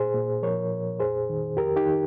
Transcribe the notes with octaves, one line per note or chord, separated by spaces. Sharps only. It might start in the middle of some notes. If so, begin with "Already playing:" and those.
Already playing: A#2 G#4 C5
A#2
F3 A#4 C#5
A#2
F2 G#4 C5
D#3
F2 G4 A#4
D#4 G4
D#3